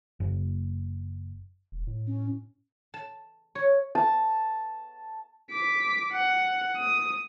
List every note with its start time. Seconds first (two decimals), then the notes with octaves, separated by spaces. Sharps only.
0.20 F#1
1.72 E1
1.87 A2
2.07 C#4
2.94 A5
3.55 C#5
3.95 A5
5.51 D6 B6
6.12 F#5
6.77 D#6